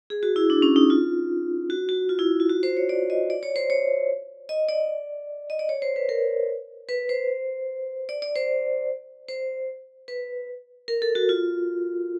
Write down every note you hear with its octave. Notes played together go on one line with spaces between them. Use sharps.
G#4
F#4
E4
D4
C#4
D#4
F4
F#4
F#4
F4
E4
F4
F#4
C5
C#5
D5
D#5
D5
C#5
C5
C#5
D#5
D5
D#5
D5
C#5
C5
B4
A#4
B4
C5
D5
D5
C5
C5
B4
A#4
A4
F#4
F4